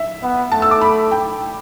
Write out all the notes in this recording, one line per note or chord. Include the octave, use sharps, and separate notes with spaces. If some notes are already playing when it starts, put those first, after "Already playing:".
Already playing: E5
B3
A3 A5
E6
D6
B5
G5